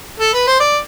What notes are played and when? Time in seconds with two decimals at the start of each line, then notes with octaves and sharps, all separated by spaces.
0.20 A4
0.33 B4
0.47 C5
0.60 D5